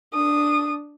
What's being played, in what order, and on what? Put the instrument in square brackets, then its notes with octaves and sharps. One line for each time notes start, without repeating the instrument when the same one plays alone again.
[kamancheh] D4 D#6